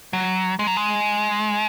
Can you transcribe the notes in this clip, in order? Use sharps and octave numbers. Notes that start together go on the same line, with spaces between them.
F#3
G#3
F#3
G#3